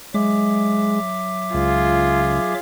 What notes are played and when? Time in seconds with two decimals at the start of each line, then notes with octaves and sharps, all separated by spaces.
0.14 F#3 G#3 E5 D6
1.54 C#2 F4 G#4